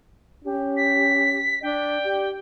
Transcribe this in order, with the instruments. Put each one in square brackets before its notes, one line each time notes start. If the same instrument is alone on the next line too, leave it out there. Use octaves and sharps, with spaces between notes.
[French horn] C#4 [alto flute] G4
[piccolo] B6
[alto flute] D4 [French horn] D5 [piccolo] G5
[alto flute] G4